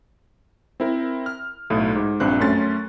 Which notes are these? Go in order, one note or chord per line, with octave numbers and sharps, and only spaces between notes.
C4 E4 A#4
F6
B1 A2
G#2
A#1 G2 C4 F#6
F#2 A3 C#4 C6 A6